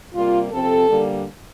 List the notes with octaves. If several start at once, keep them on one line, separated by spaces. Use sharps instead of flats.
C3 G3 A#3 F4
C3 F3 C4 A4
D3 G3 A#3